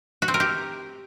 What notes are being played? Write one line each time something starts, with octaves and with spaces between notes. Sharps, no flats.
F#4
C4
A#4
G4